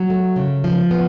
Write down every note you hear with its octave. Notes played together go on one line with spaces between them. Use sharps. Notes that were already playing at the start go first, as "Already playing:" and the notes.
Already playing: F#3
A3
C#3
F3
B3